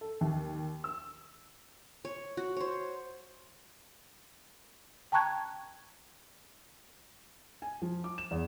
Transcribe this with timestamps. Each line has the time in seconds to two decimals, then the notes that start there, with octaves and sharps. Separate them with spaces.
0.01 A4
0.21 D#2
0.84 E6
2.05 C#5
2.37 F#4
2.57 C5 C#5
5.12 G5 A5 A#5 C#6 F#6 G#6
7.62 G#5
7.82 F3
8.04 D6
8.18 E7
8.31 E2